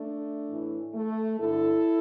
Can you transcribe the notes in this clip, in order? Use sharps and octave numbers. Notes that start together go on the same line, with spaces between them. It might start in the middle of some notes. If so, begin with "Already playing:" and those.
Already playing: A3 D4
A2 E3
A3
G2 D3 E4 A4